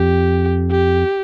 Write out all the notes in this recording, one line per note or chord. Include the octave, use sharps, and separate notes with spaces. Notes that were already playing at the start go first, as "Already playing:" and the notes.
Already playing: F2 G4
G4